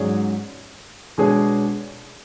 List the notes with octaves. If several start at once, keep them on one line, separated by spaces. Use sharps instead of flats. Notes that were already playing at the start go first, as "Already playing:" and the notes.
Already playing: G#2 F#3 C#4 G#4 D5
B2 G#3 D4 G#4 C#5